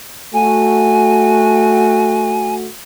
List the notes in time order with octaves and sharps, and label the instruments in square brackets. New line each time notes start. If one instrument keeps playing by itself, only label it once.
[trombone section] A3 F#4 [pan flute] G#5